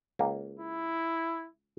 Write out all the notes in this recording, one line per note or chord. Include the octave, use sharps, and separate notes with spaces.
C#2 A#3
E4